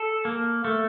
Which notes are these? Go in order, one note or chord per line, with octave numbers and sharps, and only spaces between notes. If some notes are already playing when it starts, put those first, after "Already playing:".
Already playing: A4
A#3
A3